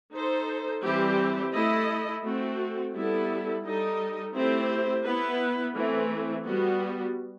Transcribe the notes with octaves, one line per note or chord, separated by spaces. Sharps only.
D#4 A4 C5
E3 G3 C4 E4 G4
A3 E4 A4 D#5
A3 C4 F#4
G3 B3 E4 A4
G3 D#4 A4 D#5
A3 C4 E4 G4 C5
B3 E4 B4
E3 A3 C4
G3 B3 F#4